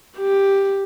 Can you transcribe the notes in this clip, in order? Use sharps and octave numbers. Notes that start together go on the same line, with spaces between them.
G4